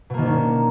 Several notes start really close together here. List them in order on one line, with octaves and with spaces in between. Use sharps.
B2 A#3 D#3 D4 C#4